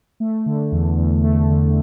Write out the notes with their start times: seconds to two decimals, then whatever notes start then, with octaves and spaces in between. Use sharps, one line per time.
0.20 A3
0.46 D3
0.72 E2
0.98 E2
1.24 A3
1.49 D3